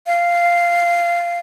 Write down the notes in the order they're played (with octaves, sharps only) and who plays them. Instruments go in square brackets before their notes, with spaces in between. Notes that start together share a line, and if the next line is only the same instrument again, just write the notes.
[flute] F5